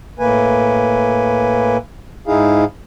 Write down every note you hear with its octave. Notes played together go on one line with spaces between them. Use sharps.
A2 A#3 B4 G#5
G#2 D#4 E4 G#4 F5